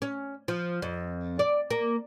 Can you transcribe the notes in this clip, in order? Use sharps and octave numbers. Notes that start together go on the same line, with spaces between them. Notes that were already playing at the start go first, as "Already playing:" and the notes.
C#4
F3
F2
D5
A#3